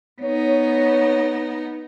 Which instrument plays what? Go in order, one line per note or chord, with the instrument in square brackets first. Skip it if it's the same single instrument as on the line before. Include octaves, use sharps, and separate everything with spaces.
[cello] B3 D#4 [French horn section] C#5